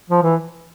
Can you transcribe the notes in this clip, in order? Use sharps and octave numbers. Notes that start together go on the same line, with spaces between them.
F3
E3